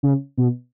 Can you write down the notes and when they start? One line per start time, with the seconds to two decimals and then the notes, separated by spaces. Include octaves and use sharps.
0.03 C#3
0.38 B2